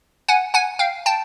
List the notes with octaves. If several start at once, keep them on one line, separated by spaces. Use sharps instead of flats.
F#5 G#5
F#5 G#5
F5 G5
G5 A5